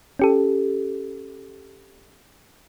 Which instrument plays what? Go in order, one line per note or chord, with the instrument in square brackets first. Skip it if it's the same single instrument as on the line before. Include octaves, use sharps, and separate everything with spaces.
[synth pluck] C#4 G4 A4